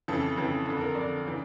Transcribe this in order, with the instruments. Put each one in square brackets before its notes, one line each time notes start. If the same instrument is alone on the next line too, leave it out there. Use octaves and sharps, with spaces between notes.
[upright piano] F2 C#3 E3 A4
F2 C#3 E3
F2 D3 A4
A#4
F2 D3 D5
C#3 E3